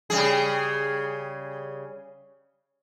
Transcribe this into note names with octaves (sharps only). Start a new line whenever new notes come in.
C#3 G3 G#4